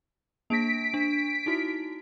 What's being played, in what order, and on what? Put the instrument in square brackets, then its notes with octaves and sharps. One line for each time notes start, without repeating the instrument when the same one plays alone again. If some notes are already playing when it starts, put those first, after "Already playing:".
[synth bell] A#3 D4 A#6 [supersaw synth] B6 D7
[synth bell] D4
D#4 E4 F#4